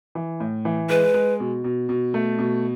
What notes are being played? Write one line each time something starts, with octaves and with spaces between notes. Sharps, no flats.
E3
A2
E3
G#3 B4
G#3
B2
B2
B2
A3
B2